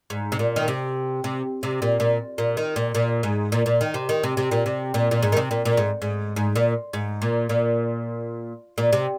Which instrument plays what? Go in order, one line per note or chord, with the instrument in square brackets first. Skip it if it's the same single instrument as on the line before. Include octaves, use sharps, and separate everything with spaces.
[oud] G#2
C3
A#2
D#3
C3
C3
C3
A#2
A#2
A#2
D#3
A#2
A#2
G#2
A#2
A#2
D#3
C3
D#3
C3
C3
A#2
C3
A#2
A#2
G#2
D#3
C3
A#2
A#2
G#2
G#2
G#2
A#2
G#2
A#2
A#2
A#2
C3